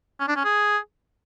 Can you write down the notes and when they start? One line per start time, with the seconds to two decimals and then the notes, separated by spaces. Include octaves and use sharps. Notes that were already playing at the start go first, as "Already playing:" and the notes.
0.20 C#4
0.28 D4
0.37 C#4
0.45 G#4